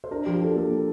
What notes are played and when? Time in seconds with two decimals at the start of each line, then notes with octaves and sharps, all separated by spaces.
0.04 C5
0.11 D4 A#4
0.26 F3 G4
0.41 D4 A4
0.56 A#3 A4
0.70 A#3